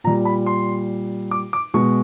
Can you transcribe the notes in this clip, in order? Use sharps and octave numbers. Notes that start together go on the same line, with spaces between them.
A#2 G3 A#5
B5
C6
D6
D6
B2 G#3 C#6